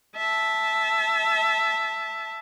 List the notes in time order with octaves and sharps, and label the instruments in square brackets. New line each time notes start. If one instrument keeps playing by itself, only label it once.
[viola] E5 A5